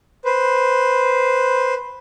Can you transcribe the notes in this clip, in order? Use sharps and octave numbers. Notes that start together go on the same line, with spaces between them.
B4 C5